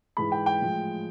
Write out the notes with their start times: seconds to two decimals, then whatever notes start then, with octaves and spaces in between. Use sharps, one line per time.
0.17 G#2 E3 G#3 B5
0.32 G5
0.46 G5
0.61 A2 F3 G#3